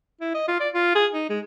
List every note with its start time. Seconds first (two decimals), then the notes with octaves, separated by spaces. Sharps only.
0.21 E4
0.34 D#5
0.48 F4
0.60 D5
0.74 F4
0.95 G#4
1.12 D#4
1.30 G#3